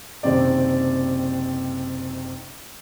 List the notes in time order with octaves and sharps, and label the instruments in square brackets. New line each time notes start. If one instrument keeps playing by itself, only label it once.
[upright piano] F#1 C3 D#3 C4 D5